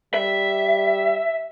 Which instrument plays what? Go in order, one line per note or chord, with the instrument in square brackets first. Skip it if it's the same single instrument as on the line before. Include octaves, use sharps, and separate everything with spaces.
[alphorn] G3 [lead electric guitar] E5